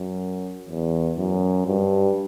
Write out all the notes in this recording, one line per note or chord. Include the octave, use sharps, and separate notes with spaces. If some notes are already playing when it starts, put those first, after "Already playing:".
Already playing: F#2
E2
F#2
G2